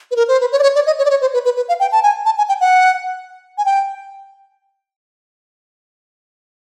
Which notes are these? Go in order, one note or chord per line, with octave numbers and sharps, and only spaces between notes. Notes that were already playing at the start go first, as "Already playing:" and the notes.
B4
A#4
C5
B4
C#5
D5
C#5
D5
D#5
C#5
D5
C#5
C5
B4
B4
B4
F5
G5
A5
G#5
A5
G#5
G5
F#5
G#5
G5